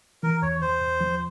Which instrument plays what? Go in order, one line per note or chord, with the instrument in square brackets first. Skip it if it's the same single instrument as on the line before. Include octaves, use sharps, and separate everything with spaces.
[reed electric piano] E3 [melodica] A#4
[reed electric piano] E2 [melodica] C#5
[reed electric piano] E2 [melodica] C5
[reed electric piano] E2
F3